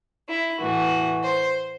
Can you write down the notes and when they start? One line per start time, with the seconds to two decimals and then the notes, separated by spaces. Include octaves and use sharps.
0.27 E4
0.59 A2 E3 F#4
1.23 C5